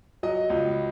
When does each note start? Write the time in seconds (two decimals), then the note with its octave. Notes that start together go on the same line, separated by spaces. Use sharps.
0.23 F#3 D#5
0.50 C#2